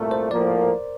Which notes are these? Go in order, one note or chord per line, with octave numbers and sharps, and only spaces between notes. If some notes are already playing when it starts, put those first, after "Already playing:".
Already playing: C2 A#2 A3 A#4
C5
A2 F3 A#3 D5